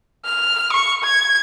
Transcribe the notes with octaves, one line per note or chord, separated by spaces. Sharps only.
F6
C#6
G#6